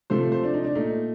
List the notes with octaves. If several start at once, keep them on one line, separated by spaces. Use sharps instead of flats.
C3 F3 A3 C5
C5
D4
D#4
D4
A#2 A3 D#4